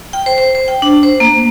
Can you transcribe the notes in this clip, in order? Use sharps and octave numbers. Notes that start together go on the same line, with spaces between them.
G5
C5
C5
C5
G5
D4
C5
A#3